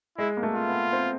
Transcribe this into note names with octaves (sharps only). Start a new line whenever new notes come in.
G#3 E4
A#3
A3
F4
B3
C4